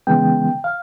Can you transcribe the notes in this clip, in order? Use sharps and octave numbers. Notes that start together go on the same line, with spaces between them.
C#3 E3 G#3 B3 G5
F5